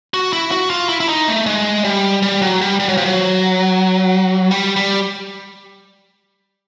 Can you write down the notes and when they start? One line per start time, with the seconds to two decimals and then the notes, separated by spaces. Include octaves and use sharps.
0.14 F#4
0.33 E4
0.51 F#4
0.70 F4
0.89 E4
1.00 E4
1.09 D#4
1.27 A3
1.46 G#3
1.85 G3
2.22 G3
2.42 F#3
2.61 G3
2.80 G3
2.89 F#3
2.97 F3
3.06 F#3
4.51 G3
4.76 G3